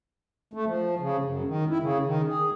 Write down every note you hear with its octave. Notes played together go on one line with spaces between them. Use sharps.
A3
F3
C#3
F#2
D#3
E4
C#3
D#3
G#4